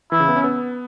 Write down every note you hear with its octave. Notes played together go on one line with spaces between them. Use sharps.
E3 E4
C#3
B3
C#4
B3